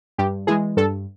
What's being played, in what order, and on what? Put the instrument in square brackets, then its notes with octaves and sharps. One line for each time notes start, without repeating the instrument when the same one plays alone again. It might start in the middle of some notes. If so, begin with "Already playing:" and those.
[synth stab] G2 G4
E3 G#3 G#4
G2 A4